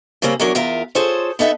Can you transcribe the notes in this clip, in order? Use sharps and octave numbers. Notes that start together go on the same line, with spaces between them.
C#3 G3 A#3 C4 C#4
E2 F#3 C#4 D4 A#4
E2 F4 A#4 E5 F5
F4 G#4 A4 C5 C#5
B3 D#4 A4 E5 F#5